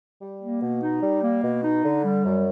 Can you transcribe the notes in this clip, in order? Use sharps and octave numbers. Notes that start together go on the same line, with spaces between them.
G3
A#3
B2
D#4
G3
A#3
B2
D#4
D3
G3
F#2